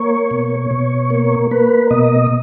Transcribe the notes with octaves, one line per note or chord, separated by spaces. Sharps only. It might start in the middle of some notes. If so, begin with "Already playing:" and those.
Already playing: A#3 C#5
B2
B2
A#3
A#3 B4
B2 D#5